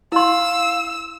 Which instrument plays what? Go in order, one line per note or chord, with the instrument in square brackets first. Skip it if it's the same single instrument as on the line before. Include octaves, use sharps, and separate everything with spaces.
[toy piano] E4 C6 [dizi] F5 [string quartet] E6